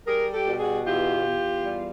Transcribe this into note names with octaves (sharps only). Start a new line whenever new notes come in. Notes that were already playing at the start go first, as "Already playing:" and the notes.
G3 G#4 A#4
G4 A4
B2
F#4 G#4
E2 F4 G4
E2
G3